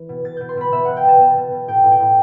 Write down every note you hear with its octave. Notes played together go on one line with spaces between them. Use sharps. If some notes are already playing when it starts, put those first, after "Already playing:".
Already playing: E3
B2
B2 A6
B2 G6
C6
B2 B5
B2 E5
B2 F#5
G5
B2 A5
B2 A5
B2
B2
A2 G5
A2
G5
A2